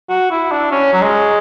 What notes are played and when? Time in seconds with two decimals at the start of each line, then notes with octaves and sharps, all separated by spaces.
0.09 F#4
0.31 E4
0.52 D4
0.72 C#4
0.93 F#3
1.02 G#3